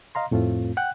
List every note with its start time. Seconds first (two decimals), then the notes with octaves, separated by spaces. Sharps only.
0.15 D#5 F5 A#5 C6
0.31 F2 A2 A3 C4 F4
0.77 F#5 G5 F#6